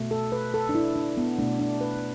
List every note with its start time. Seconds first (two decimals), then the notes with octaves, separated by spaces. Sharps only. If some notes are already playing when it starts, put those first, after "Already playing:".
Already playing: B2 A3
0.11 A4
0.32 B4
0.54 A4
0.69 D4
0.75 E4
0.96 D4
1.17 B3
1.39 B2 A3 D4
1.59 D4
1.81 B4